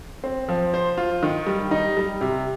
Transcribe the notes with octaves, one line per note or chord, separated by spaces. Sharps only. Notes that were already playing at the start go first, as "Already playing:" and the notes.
C4
F3
C5
F4
D#3
G3
D#4
G3
C3